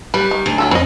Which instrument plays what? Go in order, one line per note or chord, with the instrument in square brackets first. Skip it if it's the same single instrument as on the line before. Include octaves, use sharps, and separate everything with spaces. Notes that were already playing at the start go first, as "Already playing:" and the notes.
[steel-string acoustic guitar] G3 [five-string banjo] B4
[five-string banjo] D#3
[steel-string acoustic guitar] D2
[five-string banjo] F#3 C#4 A4
[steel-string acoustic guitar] F2 [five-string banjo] B4 D#5